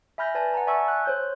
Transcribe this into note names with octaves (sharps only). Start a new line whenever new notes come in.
E5 G#5 B5 F6 G6 A#6
B4 D5 G#5 A5
F#5 A5 A#5
D5 E5 G#5 A5 C#6 E6
F#6
C5 C#5 G6